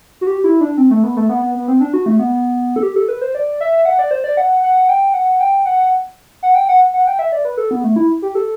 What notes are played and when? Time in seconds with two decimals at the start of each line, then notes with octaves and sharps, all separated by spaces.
0.21 F#4
0.27 G4
0.44 E4
0.61 D4
0.77 C4
0.91 A3
1.04 B3
1.16 A3
1.29 B3
1.42 B3
1.55 B3
1.68 C4
1.81 D4
1.94 F#4
2.06 A3
2.19 B3
2.76 A4
2.83 G4
2.96 A4
3.08 B4
3.21 C5
3.35 D5
3.61 E5
3.85 F#5
3.99 D5
4.11 C5
4.24 D5
4.37 F#5
4.63 F#5
4.88 G5
5.13 F#5
5.40 G5
5.66 F#5
6.43 F#5
6.55 G5
6.69 F#5
6.94 F#5
7.07 G5
7.19 E5
7.32 D5
7.45 B4
7.57 A4
7.71 B3
7.84 A3
7.96 E4
8.22 G4
8.35 A4